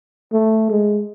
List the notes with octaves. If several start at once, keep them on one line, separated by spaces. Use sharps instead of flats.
A3
G#3